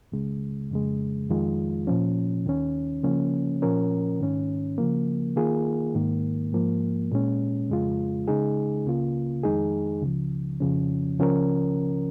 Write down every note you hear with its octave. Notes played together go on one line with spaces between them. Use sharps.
C#2 C#3 G#3
F2 C#3 G#3
F2 D#3 G#3 F4
A#2 F3 C#4
D#2 D#3 C#4
C#3 F3 A#3 C#4
A#2 F3 C#4 A#4
G#2 D#3 C#4
C#3 F3 A#3
D#3 A#3 F4 G#4
G#2 D#3 A#3
G#2 F3 A#3
A#2 G#3 C#4
F2 C#3 G#3 F4
C#3 G#3 D#4 G#4
C#2 C#3 A#3 F4
F2 D#3 G#3 D#4 G#4
C#2 C#3 F3
F2 C#3 F3 C#4
C#2 C#3 F3 C#4 A#4